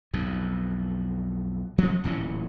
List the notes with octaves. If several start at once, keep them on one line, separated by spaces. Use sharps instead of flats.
B1 F2
F3 F#3 C#4
D1 A#2 E3 C#4